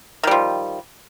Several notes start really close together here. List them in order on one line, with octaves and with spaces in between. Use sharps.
D#3 G3 F3